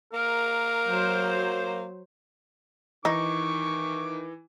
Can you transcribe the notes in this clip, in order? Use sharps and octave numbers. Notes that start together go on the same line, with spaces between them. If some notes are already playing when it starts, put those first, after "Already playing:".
A#3 A#4
F#3 C5
D#3 E3 D#4 C#6 D6